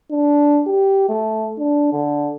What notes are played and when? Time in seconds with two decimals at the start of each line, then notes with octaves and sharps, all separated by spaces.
0.11 D4
0.67 G4
1.09 A3
1.59 D4
1.92 D3